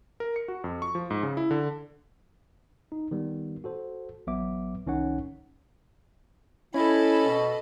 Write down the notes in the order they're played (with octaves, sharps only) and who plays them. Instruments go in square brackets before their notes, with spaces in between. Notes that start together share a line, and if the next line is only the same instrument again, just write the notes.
[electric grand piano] A#4
C#7
F#4
F2
C#6
F3
G#2
C#3
E4
D3
[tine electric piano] D#4
D#3 G3 B3
F#4 A4 C5
A1 F#3 B3 E5 D6
C2 D#3 C#4 D#4 C#5 F#5
[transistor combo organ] C#4 [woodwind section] E4 [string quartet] A4 D#5 B5
[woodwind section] B2